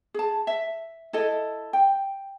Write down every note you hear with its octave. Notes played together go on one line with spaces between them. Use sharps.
G#4 A5
E5
E4 A4 D#5
G5